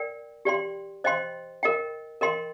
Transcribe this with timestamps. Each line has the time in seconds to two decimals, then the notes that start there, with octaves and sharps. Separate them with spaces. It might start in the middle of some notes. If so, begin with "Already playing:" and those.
Already playing: A#4 D5 G5
0.45 G4 D5 G5 C6
1.04 C5 D#5 G5 C6
1.63 A#4 D#5 G5
2.21 A#4 D#5 G5 C6